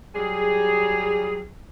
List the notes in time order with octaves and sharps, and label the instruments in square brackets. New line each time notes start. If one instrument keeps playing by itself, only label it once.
[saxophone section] F#3 G3 G#4